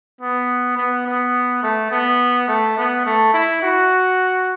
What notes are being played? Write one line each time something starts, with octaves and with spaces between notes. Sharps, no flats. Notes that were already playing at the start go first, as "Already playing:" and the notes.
B3
B3
B3
A3
B3
A3
B3
A3
E4
F#4